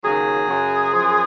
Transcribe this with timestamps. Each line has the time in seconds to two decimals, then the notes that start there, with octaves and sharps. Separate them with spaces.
0.04 D#2 C#3 F#3 G#4
0.48 F#2 C#3 F#3
0.92 F#2 F3